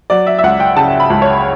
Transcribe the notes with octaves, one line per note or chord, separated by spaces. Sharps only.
F#3 D5
E5
E5
C#2 F#5
G5
C#3 A5
B5
C#2
C#5